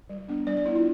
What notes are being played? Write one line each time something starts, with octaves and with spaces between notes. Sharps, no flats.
G3
B3 D4
G3 D5
D5
B3 D4 E4
F4